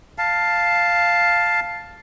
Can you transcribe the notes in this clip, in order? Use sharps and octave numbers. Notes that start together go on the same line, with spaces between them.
F5 A5